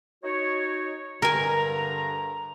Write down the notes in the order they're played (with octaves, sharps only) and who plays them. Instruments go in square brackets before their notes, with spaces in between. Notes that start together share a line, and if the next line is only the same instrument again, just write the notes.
[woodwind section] D#4 F#4 C#5
[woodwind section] G2 D3 A#5 [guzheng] A#4 G#5